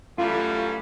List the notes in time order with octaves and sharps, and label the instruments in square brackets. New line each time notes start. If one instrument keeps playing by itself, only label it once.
[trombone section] F#2 E3 G3 [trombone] A3 [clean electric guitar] F4